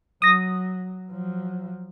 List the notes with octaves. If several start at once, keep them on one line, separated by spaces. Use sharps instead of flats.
F#3 D#6 A#6
F3 F#3